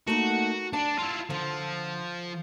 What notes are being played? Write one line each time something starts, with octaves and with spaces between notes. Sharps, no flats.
A3 A#3 D#4 F#4
D4 A5
E4 F4
D3 F3